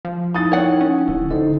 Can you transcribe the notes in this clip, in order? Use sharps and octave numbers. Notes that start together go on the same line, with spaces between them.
F3
D#4 E4 D#6 A6
C#5 F#5
C#4
D1 E4
D2 D#4 A4 C5